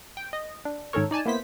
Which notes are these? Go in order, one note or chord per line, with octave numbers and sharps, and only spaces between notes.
G5
D#5
D4
G#2 D#3 C#4 A4 A#4 C#5
D#4 D5 G#5 A5
A#3 B3 E4 C5 B6